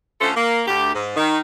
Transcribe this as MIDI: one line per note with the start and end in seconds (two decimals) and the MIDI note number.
0.21 0.31 50
0.21 0.31 57
0.21 0.31 61
0.21 0.31 65
0.21 0.31 69
0.21 0.31 72
0.36 0.62 58
0.67 0.93 38
0.67 0.93 67
0.94 1.16 44
1.17 1.37 51